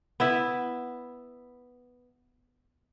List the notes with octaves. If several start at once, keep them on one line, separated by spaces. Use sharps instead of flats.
B3 E4 E5